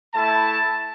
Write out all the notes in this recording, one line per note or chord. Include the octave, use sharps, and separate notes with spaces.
A3 E4 A5